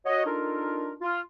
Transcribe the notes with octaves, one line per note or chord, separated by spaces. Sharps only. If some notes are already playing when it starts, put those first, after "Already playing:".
F#4 C#5 D#5
D4 D#4 F4 A4 A#4
F4